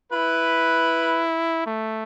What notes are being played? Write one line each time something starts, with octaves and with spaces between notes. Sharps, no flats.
E4 B4
A3